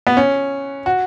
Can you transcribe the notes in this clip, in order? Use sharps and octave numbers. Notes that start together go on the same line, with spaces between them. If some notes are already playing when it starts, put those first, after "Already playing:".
B3
C#4
F#4